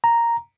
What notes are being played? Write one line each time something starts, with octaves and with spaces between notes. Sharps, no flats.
A#5